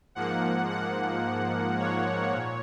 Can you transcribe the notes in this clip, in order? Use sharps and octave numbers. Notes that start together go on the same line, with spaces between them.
G#2 F3 A#3 F#5
F#5
C#5
A#2